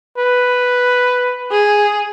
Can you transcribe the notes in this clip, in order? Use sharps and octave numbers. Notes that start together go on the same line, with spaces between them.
B4
G#4